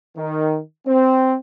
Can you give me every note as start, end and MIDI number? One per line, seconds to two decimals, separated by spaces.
0.17 0.60 51
0.87 1.35 60